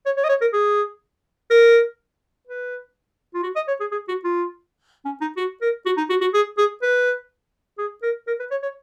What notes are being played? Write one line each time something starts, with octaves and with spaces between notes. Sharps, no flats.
C#5
C#5
D#5
C#5
A#4
G#4
A#4
B4
F4
F#4
D#5
C#5
G#4
G#4
F#4
F4
C#4
D#4
F#4
A#4
F#4
D#4
F#4
F#4
G#4
G#4
B4
G#4
A#4
A#4
B4
C#5
C#5